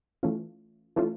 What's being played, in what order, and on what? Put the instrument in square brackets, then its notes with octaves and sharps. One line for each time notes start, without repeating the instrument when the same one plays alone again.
[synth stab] E3 A3 C#4 F4
E3 A3 C#4 F4